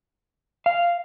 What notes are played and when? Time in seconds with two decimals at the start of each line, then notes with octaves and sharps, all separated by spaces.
0.66 F5